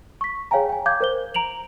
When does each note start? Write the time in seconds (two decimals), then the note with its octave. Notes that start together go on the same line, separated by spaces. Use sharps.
0.21 C#6 B6
0.51 G#4 C#5 F5 G5 G#5 A#5
0.69 G5 G#5
0.86 F5 D6 G6 G#6
1.00 A#4 C5 G7
1.34 A#5 D7 F7 F#7